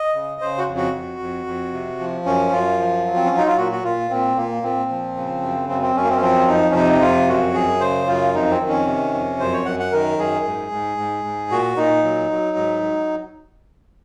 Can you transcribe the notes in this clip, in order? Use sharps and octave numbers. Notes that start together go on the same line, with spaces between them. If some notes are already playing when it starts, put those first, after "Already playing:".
Already playing: D#5
C#3
C#3 C5
F#4
F2
F#4
F2
F2
F2
C3
F3
F#2 C#4
F#2 F4
F3
F#3
C4
C#4
F#3
D#4
F4
A#2 F#4
F#4
A#2 F4
A#2 C4
A#2 A#3
A#2 C4
F3
C#3
F#2
F#2 C4
C4
F#2 C#4
A#3
C4
C#4
F3 C4
F2 D#4
C#4
C3 D#4
F2 F4
F#2 F#4
F#2 G#4
C#3 C5
F#2 F4
F2 D#4
C4
D#3
C#4
C3
F2
F#2 C5
C#5
F#2 F#5
F#5
D#3 A#4
F#2 G#4
G#2
G#2
G#2
G#2
A#2 F#4
A#2 D#4
F#3
F#3
G#2
F#3